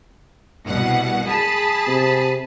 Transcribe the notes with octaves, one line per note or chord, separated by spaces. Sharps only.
C2 B2 F#5
G#4 A5 B5
C3